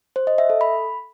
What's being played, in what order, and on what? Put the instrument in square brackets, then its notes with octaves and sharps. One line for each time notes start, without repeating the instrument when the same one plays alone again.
[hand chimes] C5
D#5
E5
A4
B5